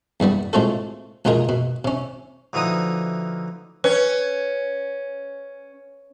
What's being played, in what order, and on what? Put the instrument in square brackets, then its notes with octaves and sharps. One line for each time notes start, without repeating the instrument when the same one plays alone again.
[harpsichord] E2 G2 G3 B3
A2 G#3 C4 F4 F#4 A4
C#2 B2 D#4 F4 G#4 A#4
B2
C3 C#4
D2 E3 F3 D#4 D#6
[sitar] C#4 [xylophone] B4